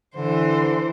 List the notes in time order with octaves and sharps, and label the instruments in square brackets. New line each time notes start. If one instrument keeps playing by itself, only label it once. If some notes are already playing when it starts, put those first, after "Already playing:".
[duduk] D3 [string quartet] E3 C5